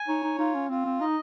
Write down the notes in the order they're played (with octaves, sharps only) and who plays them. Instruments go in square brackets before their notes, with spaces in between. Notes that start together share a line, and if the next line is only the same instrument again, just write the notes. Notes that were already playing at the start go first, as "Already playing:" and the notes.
Already playing: [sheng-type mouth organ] G#5
[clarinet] D#4 [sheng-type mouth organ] C#5
[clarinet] D#4
[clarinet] D#4 [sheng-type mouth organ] F4
[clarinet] C#4
[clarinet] C4 [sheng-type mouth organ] F4
[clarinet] C4
[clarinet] D#4 [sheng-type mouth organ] D#5